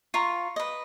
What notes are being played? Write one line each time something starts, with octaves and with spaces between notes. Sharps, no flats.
F4 A#5 C#6
B4 D#5